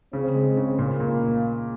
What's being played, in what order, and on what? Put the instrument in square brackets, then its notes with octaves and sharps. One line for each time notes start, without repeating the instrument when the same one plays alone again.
[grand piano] C#3 [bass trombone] C4
[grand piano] G#3
C#3
[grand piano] A#2 [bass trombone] A#3
[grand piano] A#2